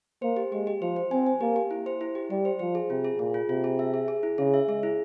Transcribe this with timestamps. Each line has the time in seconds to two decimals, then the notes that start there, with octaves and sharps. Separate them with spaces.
0.22 A#3 C5
0.37 G4
0.52 G#3 G4
0.67 G4
0.81 F3 C5
0.96 C5
1.11 C4 G#5
1.26 G#5
1.41 A#3 G4
1.56 G4
1.71 E4
1.86 C5
2.01 E4
2.15 G4
2.30 G3 G4
2.45 C5
2.59 F3 C5
2.75 G#4
2.90 C3 F4
3.04 G#4
3.19 A#2 G#4
3.34 F4
3.49 C3 F4
3.64 G#4
3.79 E5
3.94 G#4
4.08 G#4
4.23 E4
4.38 C#3 G#4
4.54 E5
4.68 G#3 G#4
4.83 E4